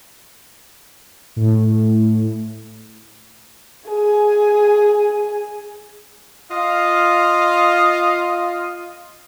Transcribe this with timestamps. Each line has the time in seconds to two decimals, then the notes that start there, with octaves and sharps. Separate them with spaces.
1.36 A2
3.88 G#4 G#5
6.51 F4 D#5 F5